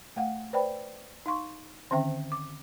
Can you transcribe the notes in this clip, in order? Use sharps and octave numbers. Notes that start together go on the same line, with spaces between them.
A3 F5 F#5
B4 C5 D5 G5 B5
D#4 F5 C6 C#6
D3 D#3 C4 C#4 E5 G5
D6